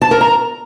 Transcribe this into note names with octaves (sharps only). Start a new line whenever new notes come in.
A5
A#4
A#5